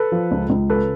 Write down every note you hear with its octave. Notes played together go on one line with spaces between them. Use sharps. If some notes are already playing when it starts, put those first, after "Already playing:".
Already playing: A4 B4
F3
C#2
C#2
C#3 A4 B4